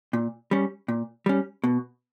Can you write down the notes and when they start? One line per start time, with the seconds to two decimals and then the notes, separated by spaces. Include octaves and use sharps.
0.13 A#2
0.51 G3 C#4
0.88 A#2
1.26 G3 C#4
1.64 B2